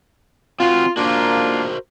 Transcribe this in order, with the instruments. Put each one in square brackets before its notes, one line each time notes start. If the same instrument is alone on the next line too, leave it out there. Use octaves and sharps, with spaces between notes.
[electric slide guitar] C4 F#4 [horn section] F4
[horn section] A#3 D4 F4 [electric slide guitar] F#4 A#4 C5